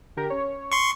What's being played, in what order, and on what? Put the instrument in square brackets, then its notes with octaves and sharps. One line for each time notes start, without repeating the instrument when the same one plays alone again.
[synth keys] D3 G4 A#4
C#4 C#5
[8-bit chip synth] C6 C#6